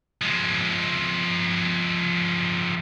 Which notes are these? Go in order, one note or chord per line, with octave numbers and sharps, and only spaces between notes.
F3 G#3